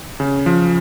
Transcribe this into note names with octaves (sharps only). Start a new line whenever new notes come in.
C#3
F3